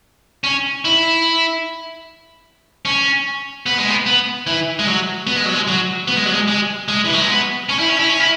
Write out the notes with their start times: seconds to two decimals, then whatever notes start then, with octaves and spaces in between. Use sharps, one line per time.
0.44 C#4
0.85 E4
2.85 C#4
3.66 B3
3.78 G#3
3.90 B3
4.06 B3
4.47 E3
4.79 G#3
4.87 F#3
5.27 B3
5.36 G#3
5.45 F#3
5.55 G#3
5.67 F#3
6.08 B3
6.17 G#3
6.26 F#3
6.34 G#3
6.48 G#3
6.88 G#3
7.04 E3
7.13 F#3
7.21 G#3
7.29 B3
7.69 C#4
7.79 E4
7.89 C#4
7.99 E4
8.10 C#4
8.20 E4